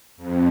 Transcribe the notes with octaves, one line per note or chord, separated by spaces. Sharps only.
F2